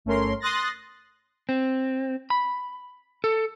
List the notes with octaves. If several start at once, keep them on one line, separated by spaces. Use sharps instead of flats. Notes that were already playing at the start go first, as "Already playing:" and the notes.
G1 A3 C#4 A#4 C6
C6 D#6 F#6 A6 A#6
C4
B5
A4